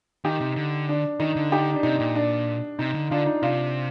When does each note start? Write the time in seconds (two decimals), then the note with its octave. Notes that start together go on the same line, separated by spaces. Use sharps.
0.25 D#3 D#4 G4
0.41 C3
0.56 D3
0.89 D4
1.20 D#3 D#4
1.36 D3
1.52 D#4 G4
1.73 D4
1.83 C3 D#4
2.00 A#2
2.15 D4
2.79 C3 D#4
2.95 D3
3.10 D3 D4 F4
3.26 D#4
3.42 C3 D4 F4